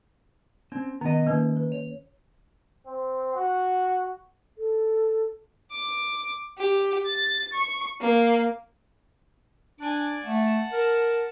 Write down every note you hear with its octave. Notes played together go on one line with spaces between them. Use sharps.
C4 C#4
D#3 B3 D#5
D#3 A#3 C#4 B4
B4
C#5
C4
F#4
A4
D6
G4
A6
C#6
A#3
D4 D5 G#5
A3 F#5 A5
A#4